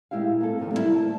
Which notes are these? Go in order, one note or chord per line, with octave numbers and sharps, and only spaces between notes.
A#2 G#3 E4 G4 F5
A#3 C4 A4
F2 A2 C3 D#3 C4
G3 A#3 B3 E4 E5
D2 A5